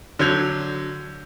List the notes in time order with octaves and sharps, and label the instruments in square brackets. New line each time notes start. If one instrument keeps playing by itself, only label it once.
[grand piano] D3 F#3 G6 G#6 F7